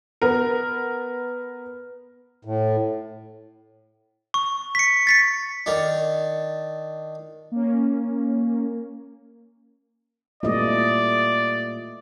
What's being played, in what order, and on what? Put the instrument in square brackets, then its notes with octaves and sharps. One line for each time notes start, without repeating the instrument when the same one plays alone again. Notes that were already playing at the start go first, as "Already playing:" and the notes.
[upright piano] B3 A#4
[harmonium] A2
[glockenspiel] C#6
B6 C#7
A6 B6 C#7
[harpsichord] D#3 D4
[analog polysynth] A#3 C#4
[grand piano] A#2 E3 G3 [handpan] A3 D#5 [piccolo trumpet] D5